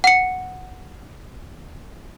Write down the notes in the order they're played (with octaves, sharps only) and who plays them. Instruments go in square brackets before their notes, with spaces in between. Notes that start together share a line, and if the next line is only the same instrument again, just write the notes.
[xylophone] F#5 C#7